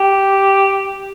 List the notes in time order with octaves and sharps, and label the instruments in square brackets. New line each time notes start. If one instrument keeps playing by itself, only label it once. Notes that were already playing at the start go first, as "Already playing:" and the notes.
Already playing: [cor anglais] G4